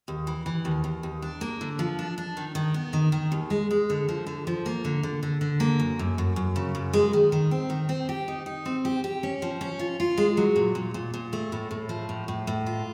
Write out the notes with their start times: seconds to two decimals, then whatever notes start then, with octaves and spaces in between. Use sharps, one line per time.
0.08 D#2
0.27 E3
0.46 E3
0.65 D#2
0.84 D#2
1.03 D#2
1.22 D4
1.41 A#3
1.61 D3
1.79 F3
1.99 D4
2.18 D4
2.37 D#3
2.55 D#3
2.74 B3
2.93 D#3
3.12 D#3
3.32 D#2
3.50 G#3
3.71 G#3
3.90 D3
4.09 F3
4.27 D3
4.47 F3
4.66 A#3
4.85 D3
5.03 D3
5.23 D3
5.41 D3
5.60 A#3
5.80 F#2
5.99 F#2
6.18 F#2
6.36 F#2
6.56 C#3
6.75 F#2
6.93 G#3
7.13 D#3
7.32 D#3
7.51 C4
7.70 D#3
7.89 C4
8.09 G4
8.28 D#4
8.46 D#4
8.66 C4
8.85 G4
9.04 G4
9.23 C#4
9.42 F3
9.61 C#4
9.79 F4
10.00 F4
10.18 G#3
10.37 F#3
10.56 A#2
10.75 A#2
10.94 A#2
11.14 A#2
11.33 A3
11.52 A2
11.71 A2
11.89 F3
12.09 A2
12.28 A2
12.47 A2
12.66 F4